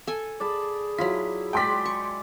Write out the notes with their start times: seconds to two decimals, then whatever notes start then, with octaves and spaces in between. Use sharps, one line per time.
0.07 A4 G#5
0.40 G#4 D5 A5 B5
0.99 F#3 E4 F4 B6
1.53 G#3 D5 G5 C6 B6
1.85 C#6